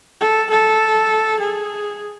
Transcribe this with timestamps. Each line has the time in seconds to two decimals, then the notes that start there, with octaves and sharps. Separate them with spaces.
0.21 A4
0.50 A4
1.39 G#4